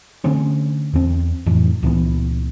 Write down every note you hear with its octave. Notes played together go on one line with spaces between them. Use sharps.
D3 A3 C4 C#4
E2 C4
F2 A2 E3
C#2 A#2 E3 B3